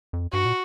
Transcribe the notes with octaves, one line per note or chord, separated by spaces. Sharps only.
F2
G2 F#4
A#2